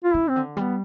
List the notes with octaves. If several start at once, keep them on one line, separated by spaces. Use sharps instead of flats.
F4
C#3 E4
C4
D3
G3 B3